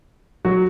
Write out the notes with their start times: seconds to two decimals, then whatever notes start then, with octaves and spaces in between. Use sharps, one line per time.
0.45 F#3 F#4